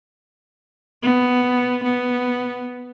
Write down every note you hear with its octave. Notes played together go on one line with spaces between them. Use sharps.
B3
B3